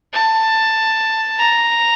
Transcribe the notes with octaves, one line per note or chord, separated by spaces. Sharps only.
A5
A#5